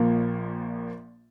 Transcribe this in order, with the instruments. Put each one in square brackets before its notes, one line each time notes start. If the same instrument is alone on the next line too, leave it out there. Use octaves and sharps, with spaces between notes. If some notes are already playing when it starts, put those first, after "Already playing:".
Already playing: [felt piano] A#1 A#2 F3 A#3